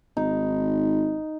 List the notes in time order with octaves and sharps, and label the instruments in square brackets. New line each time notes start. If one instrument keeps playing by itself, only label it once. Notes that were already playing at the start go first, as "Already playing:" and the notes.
[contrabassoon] G#1 [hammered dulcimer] D#4